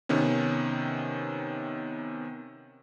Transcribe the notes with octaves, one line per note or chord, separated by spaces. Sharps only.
C3 D#3 B3 C#4